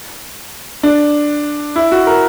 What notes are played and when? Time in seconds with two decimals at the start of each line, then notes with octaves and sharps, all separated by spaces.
0.83 D4
1.76 E4
1.92 F#4
2.07 A#4